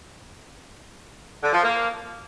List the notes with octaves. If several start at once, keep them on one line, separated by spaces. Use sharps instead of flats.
D3
F3
A#3